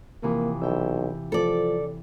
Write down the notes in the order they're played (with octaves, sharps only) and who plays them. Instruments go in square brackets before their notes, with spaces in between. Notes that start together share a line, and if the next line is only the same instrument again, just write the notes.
[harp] C3 E3 F3 [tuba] A#3
[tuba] B1 [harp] E5 G5
[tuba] F3 [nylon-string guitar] A4 D5